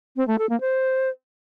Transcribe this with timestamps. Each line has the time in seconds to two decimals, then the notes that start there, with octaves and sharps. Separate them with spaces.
0.16 C4
0.27 A3
0.38 A4
0.49 A#3
0.60 C5